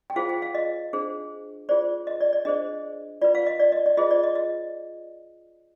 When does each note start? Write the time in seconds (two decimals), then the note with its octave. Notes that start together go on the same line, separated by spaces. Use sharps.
0.10 G5
0.16 F4 G#4 C5 F5
0.29 G5
0.42 F5
0.55 D#5
0.93 D4 G#4 C5
1.69 F4 G#4 C5 D5
2.07 D#5
2.21 D5
2.33 D5
2.45 D4 G#4 C5 D#5
3.22 F4 B4 D5
3.35 F5
3.47 D#5
3.60 D5
3.72 D#5
3.86 D5
3.97 F4 G#4 C5 D#5
4.11 D5
4.24 D#5
4.35 D#5